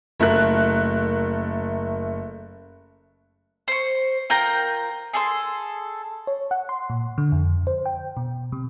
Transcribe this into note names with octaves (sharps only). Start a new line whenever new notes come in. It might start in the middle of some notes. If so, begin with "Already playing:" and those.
F#1 A3 A#4 F#6
C5 C#6
F4 A#4 G5 A#5
G#4 A4 C6
C#5
F#5
C6
A#2
D3
F2
C5
G5
B2
C3